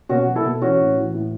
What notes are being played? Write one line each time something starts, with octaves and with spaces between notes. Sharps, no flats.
B2 C#4 F#4
F#3
E4 A4
B2
E3 C#4 F#4
A2
E3
A2